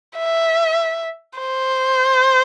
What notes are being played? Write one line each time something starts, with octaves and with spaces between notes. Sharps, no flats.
E5
C5